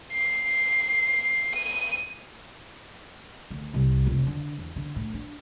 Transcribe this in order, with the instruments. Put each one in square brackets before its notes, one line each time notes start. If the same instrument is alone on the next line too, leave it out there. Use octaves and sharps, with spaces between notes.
[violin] C7
D#7
[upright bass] D2
C2
F1
D3
E2
D3
A2
D4